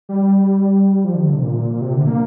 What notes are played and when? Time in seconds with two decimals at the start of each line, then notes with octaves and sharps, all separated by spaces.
0.09 G3
1.05 F3
1.15 D#3
1.24 D3
1.34 C3
1.43 A#2
1.81 C3
1.94 D3
2.07 A#3